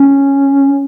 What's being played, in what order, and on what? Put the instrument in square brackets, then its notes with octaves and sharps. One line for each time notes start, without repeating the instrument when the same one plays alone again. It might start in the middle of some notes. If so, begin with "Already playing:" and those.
Already playing: [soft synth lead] C#4